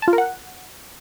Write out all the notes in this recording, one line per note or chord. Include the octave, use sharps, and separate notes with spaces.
A5
F4
A#4
F#5